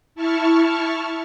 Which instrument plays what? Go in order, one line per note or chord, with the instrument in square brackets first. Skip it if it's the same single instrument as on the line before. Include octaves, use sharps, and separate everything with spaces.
[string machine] E4 A5 C#6 F6